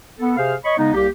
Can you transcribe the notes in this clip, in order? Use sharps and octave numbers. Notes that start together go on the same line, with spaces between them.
B3 A4
C3 G#4 C5 F5
C#5 D#5 B5 C#6
C#3 G#3 B3 D#4
C2 A#3 G4